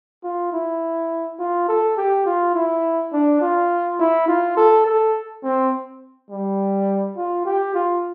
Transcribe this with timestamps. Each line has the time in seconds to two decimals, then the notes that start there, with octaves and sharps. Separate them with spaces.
0.24 F4
0.52 E4
1.39 F4
1.68 A4
1.97 G4
2.26 F4
2.55 E4
3.13 D4
3.41 F4
3.99 E4
4.28 F4
4.57 A4
4.86 A4
5.43 C4
6.30 G3
7.16 F4
7.45 G4
7.74 F4